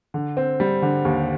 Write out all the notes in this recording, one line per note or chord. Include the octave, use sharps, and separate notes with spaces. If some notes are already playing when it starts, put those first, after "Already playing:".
D3
C4
G3
D3
D#2